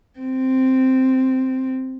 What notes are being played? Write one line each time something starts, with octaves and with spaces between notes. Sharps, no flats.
C4